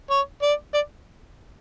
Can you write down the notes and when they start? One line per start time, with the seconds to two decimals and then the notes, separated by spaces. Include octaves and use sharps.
0.10 C#5
0.42 D5
0.74 D5